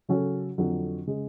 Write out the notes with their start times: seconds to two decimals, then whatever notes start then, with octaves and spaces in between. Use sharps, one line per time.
0.09 C#3 F#3 C#4 F#4 A4
0.58 F2 D3 F#3
1.07 C#3 G#3